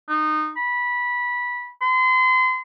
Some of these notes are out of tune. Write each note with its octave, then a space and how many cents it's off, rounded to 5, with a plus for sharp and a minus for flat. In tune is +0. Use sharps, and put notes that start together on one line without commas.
D#4 -20
B5 -15
C6 -35